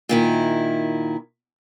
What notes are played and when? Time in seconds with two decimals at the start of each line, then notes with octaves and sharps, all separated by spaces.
0.09 A#2 D#3 E4